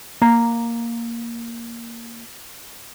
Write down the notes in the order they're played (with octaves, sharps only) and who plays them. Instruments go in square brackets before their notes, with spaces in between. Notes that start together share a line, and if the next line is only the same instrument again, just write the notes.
[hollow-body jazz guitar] A#3 A#5